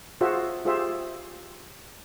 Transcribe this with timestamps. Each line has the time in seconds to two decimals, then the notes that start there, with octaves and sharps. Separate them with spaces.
0.21 F4 F#4 G#4 C5 E5
0.65 F4 G4 G#4 C5 E5